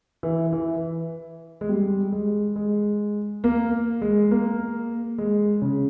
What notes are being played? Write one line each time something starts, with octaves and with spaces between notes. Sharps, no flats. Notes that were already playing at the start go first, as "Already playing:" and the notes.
E3
E3
G#3
G3
G#3
G#3
A#3
G#3
A#3
G#3
C#3